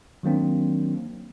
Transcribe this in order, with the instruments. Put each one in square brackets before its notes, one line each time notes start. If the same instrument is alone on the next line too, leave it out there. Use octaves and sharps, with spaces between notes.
[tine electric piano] D#3 F#3 A#3 C4 D4